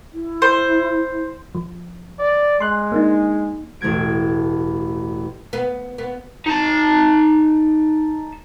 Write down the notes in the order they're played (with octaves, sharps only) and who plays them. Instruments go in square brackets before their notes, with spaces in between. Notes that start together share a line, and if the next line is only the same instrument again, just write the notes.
[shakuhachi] E4
[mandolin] C5
[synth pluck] F3
[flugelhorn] D5
[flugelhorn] G#3 [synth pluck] C6 F#6
[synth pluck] A#3 D4 D#4
[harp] E1 A1 A3 G#6 D7
[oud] B3
B3
[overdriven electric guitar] D#4 A5